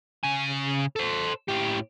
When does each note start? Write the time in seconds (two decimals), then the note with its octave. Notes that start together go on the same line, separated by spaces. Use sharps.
0.24 C#3 G#5
0.96 A4 C5
1.48 A2 G4